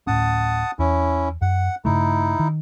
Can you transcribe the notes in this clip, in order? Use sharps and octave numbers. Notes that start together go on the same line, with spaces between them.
D1 A2 C#4 F#5 A5 D#6
E2 C#4 E4
F#2 F#5
G2 C#3 A3 D#4 E4
D#3